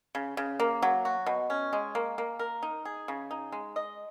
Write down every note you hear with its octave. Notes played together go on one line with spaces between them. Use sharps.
C#3
C#3
A#3
F#3
F#4
B2
C#4
G#3
A#3
A#3
A#4
D#4
G#4
C#3
D#4
G#3
D#5